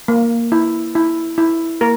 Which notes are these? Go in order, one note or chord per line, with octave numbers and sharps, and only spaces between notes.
A#3
E4
E4
E4
A#3 A#4